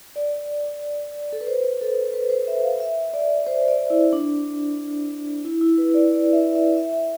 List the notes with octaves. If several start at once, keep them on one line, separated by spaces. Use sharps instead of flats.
D5
A4
B4
C5
B4
A4
B4
C5
E5
F5
E5
D5
C5
D5
E4
D4
E4
E4
B4
D5
D5
E5
E5
E5
E5